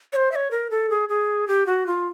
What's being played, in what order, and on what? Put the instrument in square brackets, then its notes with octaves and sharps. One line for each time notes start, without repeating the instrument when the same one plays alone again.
[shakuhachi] C#5
C5
E5
C#5
A#4
A4
G#4
G#4
G4
F#4
F4